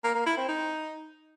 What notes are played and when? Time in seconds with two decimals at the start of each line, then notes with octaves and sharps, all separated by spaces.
0.04 A#3
0.15 A#3
0.26 E4
0.37 C4
0.48 D#4